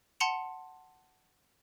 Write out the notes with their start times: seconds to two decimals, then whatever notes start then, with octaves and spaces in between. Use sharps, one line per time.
0.20 F#5 A5 C6 C#7 F7